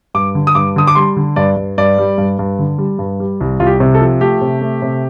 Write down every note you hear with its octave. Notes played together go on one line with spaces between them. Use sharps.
G2 D6
D3
D#6
G2 D6
D3 D#6
D6
G3 C6
D3
G2 D5
G2
G2 D5
G3
G2
G2
D3
G3
G2
G3
C2
C2 F4
G4
C3
A4
F3
A3 G4
C3
A3
C3